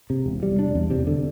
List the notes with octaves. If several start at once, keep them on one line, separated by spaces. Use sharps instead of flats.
C3
E1
G3
D4
E2
C3
D3